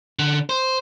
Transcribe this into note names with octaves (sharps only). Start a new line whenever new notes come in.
D3
C5